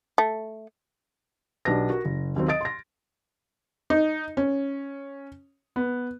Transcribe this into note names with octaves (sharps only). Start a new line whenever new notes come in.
A3
B1 D4 G4 B4 A#6
F#4 A#4
F#1
D#2 F#3 C4
D#5 D#6 A6 D7
C6 A#6
D#4
C#4
B3